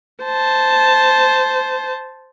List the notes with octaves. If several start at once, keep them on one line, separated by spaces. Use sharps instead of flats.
C5 A5